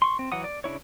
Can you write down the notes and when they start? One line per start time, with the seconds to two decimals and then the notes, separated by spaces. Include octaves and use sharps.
0.02 C6 C#6
0.19 C4
0.32 E3 F#3 F#5 D#6
0.44 D5
0.64 C#3 D4 E4 C#5